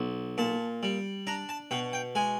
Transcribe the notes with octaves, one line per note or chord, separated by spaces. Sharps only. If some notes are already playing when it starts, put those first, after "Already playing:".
Already playing: B1
A#2 A5
G3
D4 A#5
A5
B2 G5
G5
G#3 G#5